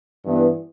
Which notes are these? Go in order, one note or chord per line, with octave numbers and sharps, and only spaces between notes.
G2 E3 B3 E4